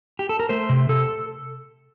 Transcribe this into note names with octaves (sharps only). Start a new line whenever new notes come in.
G4
A4
A#4
A3 C5
C3
C3 A4